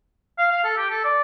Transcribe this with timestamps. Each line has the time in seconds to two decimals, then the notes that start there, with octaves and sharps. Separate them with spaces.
0.38 F5
0.51 F5
0.64 A4
0.77 G4
0.90 A4
1.04 D5